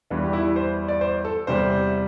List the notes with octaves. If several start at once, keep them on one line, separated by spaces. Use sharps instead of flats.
E2 E3 G3 D4
G4
E4
C5
D5
C5
A4
E2 C3 G3 C5